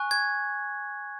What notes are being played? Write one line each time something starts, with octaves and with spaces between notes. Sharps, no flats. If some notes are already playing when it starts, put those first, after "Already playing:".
Already playing: G#5 C#6 F#6
G#6